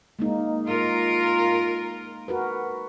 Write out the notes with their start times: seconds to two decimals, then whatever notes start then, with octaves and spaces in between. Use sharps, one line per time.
0.19 G#3 A#3 D#4
0.66 F4 A#4
2.28 F#4 A#4 B4